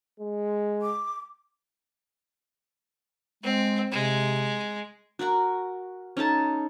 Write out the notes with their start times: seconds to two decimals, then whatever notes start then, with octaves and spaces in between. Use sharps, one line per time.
0.20 G#3
0.82 D6
3.43 G#3 C4
3.92 C3 G#3
5.19 F#4 A#4 F#5 C#6
6.17 C#4 D#4 A4 A5